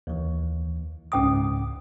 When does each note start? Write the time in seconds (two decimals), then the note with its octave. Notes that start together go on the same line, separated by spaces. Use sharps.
0.07 D#2 E3
1.12 C#2 G#2 C#4 G5 D6 D#6